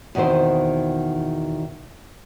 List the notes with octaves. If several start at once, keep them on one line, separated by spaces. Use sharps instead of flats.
E2 B2 D#3 C4 C5